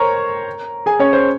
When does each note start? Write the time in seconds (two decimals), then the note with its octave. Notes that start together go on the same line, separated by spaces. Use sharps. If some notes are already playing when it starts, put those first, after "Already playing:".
Already playing: A#4 C5 C#5 A#5 C#6
0.86 G#4 G#5
0.99 C#4 C#5
1.13 C5